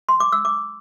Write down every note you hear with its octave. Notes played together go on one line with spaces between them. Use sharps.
C6
D6
E6
D6